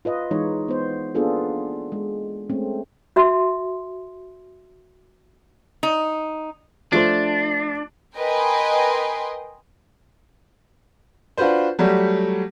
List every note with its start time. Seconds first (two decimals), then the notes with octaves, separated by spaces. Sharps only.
0.05 F4 B4 D#5
0.31 E3 G#3 D#4 C#5
0.68 B3 C5
1.15 A#3 B3 D4 F4 G#4 A4
1.92 G#3
2.50 G#3 A3 C4 C#4
3.16 F#4 E5 C6
5.83 D#4
6.92 F3 A3 D4 C5
8.17 A#4 B4 D#5 G5 G#5 C6
11.37 D4 F4 F#4 B4 C5
11.79 F#3 G3 A3 G4